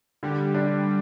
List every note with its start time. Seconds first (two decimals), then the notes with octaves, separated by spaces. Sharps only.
0.23 D3 G3
0.54 D4